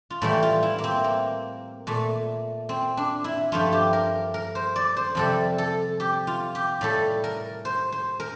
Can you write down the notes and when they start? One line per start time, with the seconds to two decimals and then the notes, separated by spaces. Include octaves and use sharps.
0.10 F4
0.22 A2 E3 G3 E4
0.43 F4
0.63 E4
0.78 A#3
0.84 C4
1.04 A#3
1.87 A#2 A3
2.69 C4
2.97 D4
3.24 E4
3.52 G2 F3 A3 F4
3.72 G4
3.93 A#4
4.34 A#4
4.55 C5
4.76 D5
4.97 C5
5.15 F2 C3 G3 A4
5.58 A4
6.00 G4
6.27 F4
6.55 G4
6.81 A2 G3 A4
7.24 A#4
7.65 C5
7.92 C5
8.20 A#4